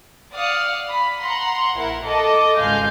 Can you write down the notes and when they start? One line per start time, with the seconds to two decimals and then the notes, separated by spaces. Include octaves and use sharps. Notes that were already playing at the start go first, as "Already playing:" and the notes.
0.34 D5 F5 F#5 D#6
0.89 B5
1.20 F#5 A#5 C6
1.75 A#1 E4 A#4 F#5
2.04 A4 D#5 A5 D6
2.59 G#1 C#2 G#3 F5 G#5 G6